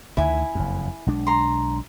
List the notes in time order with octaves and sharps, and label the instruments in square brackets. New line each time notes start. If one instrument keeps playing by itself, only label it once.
[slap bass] D2 D3 D#3 [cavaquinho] E4 G#5
[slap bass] F#1 F2
B1 G#3 D4
[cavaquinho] A#5 C6